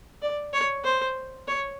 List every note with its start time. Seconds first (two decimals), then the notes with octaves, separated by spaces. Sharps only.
0.22 D5
0.53 C#5
0.84 C5
1.48 C#5